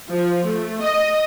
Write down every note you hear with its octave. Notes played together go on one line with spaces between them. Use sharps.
F3
A3
D#5